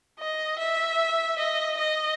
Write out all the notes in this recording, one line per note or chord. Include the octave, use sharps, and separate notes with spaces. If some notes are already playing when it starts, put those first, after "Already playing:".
D#5
E5
D#5
D#5